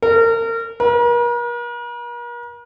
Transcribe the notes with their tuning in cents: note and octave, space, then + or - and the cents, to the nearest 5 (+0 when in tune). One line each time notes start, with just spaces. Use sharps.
A#4 -30
A#4 +45